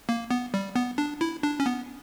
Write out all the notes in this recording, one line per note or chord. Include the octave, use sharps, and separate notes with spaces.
A#3
B3
G3
B3
D4
E4
D4
C#4
B3